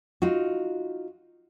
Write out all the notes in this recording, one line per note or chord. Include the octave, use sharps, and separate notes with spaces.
D#4 F4 F#4